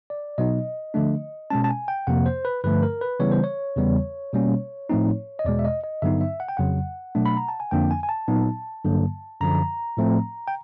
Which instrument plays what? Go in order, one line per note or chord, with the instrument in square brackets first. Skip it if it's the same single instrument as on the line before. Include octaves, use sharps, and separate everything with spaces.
[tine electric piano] D5
B2 F#3 B3 D#4 D#5
D3 F3 A3 D4
B2 G#3 C#4 A5
A5
G#5
G5
F2 C3 F3 A#3 F#5
C5
B4
G2 D3 F3 A3 B4
A#4
B4
C#3 E3 G3 B3 C#5
C5
C#5
E2 C#3 E3 G3 B3
B2 G3 A#3 C#4
A2 F3 A3 C4 D#4
D#5
E2 B2 G#3 D5
E5
D#5
D#5
G2 D3 F#3 B3 D#4 E5
E5
F#5
G5
F2 C#3 F#3 F#5
B2 F#3 A3 D4
B5
A#5
A5
G#5
F2 D3 F3 A#3 D4 G5
G#5
G#5
A5
A#2 F#3 B3 D#4
G2 D3 F#3 A#3
F#2 D3 F3 A#5
A2 F3 A3 C4
G5